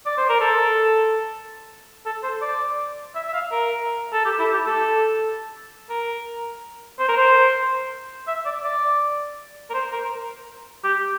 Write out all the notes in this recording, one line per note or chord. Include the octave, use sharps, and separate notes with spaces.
D5
C5
A#4
A4
A4
C5
D5
E5
E5
F5
A#4
A4
G4
E4
G4
A4
A#4
C5
A#4
C5
E5
D5
D5
A#4
C5
A#4
G4